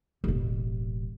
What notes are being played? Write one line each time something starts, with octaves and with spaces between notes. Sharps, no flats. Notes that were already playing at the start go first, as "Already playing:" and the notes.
E1 A1